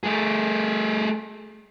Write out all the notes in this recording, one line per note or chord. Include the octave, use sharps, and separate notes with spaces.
A3 G#4